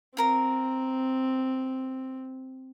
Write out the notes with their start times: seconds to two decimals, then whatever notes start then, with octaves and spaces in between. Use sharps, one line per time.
0.17 C4 F4 A#4 A#5